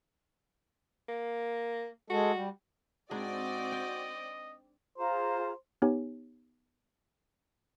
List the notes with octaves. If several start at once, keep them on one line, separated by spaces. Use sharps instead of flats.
A#3
G#3 F#4 A4
G3
G#2 C4 D4 F#4 G#4 D5 D#5
G5
F4 G#4 C5 A#5
B3 D#4 G4 C#5 G#5